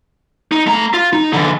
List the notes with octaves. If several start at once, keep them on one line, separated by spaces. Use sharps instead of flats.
D#4
A3 A#5
F4
D#4
D3 E3